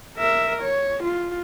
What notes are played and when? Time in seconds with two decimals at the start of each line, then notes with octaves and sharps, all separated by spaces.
0.17 A#4 E5
0.62 C#5
1.04 F4